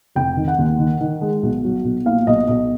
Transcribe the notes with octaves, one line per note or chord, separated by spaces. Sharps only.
F1 G5
D#3
F#5
D#2
D#3
D#3
G#3
B1
F#3
B1
A#2 F5
B1 D#5
B1 D#5